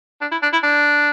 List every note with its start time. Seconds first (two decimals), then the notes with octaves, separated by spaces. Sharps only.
0.21 D4
0.32 E4
0.43 D4
0.53 E4
0.63 D4